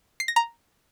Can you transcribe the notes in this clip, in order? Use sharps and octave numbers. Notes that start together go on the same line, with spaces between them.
C7
A#6
A#5